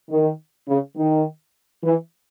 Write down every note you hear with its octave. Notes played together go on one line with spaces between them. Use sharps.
D#3
C#3
D#3
E3